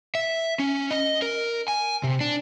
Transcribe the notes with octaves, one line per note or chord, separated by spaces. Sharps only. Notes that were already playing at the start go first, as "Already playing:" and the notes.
E5
C#4
D#5
A#4
G#5
C3
D4